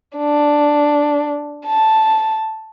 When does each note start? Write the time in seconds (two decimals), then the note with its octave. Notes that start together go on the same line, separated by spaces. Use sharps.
0.16 D4
1.66 A5